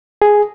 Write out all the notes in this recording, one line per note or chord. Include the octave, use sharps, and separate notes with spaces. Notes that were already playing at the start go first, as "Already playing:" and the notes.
G#4